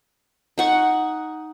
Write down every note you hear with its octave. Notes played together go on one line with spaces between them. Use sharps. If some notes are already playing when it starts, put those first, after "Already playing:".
D#4 F#5 C#6